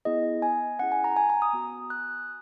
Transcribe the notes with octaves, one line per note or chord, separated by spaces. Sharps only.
B3 E4 G#4 D#5
G#5
C#4 E4 G#4 F#5
G#5
A#5
G#5
A#5
D#6
B3 F#4
F#6